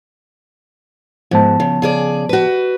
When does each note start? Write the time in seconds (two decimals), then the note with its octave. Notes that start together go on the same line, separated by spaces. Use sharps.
1.31 G#2 F3 B3 A5
1.60 C#3
1.82 C#3 G#4 D5
2.29 F#4 B4